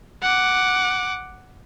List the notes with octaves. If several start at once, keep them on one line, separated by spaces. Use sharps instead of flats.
F#5 D6